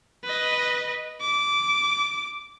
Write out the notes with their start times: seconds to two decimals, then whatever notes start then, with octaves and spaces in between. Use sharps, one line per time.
0.24 B4 D#5
1.21 D6